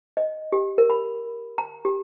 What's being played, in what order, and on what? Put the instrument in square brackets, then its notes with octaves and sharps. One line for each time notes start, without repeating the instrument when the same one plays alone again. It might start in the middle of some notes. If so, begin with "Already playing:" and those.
[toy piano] D#5
G4
A#4
B5
A#5
G4